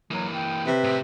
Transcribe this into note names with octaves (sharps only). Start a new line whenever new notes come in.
E3 F#3 A#3
G5
C3 B4
A2 C4